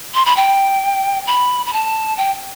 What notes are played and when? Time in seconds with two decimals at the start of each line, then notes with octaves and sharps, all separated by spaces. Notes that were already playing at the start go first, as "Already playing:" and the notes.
0.14 C6
0.25 B5
0.37 G5
1.27 B5
1.66 B5
1.73 A5
2.17 G5